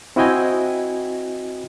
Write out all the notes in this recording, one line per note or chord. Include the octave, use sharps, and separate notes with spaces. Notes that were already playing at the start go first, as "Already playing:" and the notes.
C4 E4 F#4 D#5 G5 G#5